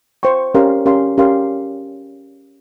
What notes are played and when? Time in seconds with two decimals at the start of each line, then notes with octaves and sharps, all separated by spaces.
0.23 C5 G5 C#6
0.55 C#4 G4 A#4 F5 C6
0.86 C#4 G4 A#4 F5 C6
1.18 C#4 G4 A#4 F5 C6